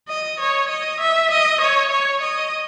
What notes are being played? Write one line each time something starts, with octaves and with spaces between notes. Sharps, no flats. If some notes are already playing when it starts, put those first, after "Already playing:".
D#5
C#5
D#5
E5
D#5
C#5
C#5
D#5